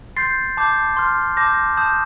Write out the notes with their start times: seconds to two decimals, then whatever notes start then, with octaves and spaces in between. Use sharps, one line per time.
0.17 C6 G6 A6 C7
0.57 A5 D6 G6
0.97 C6 F6
1.37 A5 D6 G6 A#6
1.77 A5 D#6 G6